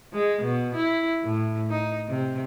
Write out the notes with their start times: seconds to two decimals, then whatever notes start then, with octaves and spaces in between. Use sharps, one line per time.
0.13 G#3
0.42 B2
0.75 E4
1.23 A2
1.70 D#4
2.08 C3